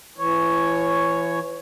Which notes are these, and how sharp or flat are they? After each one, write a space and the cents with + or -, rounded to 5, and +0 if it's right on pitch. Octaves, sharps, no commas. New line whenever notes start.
E3 +30 C#5 +0